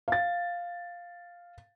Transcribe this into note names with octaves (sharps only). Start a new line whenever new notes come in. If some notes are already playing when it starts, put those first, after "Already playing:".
F5 A6